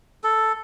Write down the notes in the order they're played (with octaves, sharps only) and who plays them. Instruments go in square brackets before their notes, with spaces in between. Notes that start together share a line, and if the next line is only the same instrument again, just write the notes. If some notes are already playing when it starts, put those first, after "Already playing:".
[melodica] A4